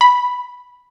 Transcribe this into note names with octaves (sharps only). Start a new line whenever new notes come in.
B5